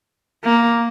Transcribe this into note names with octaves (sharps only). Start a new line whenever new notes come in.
A#3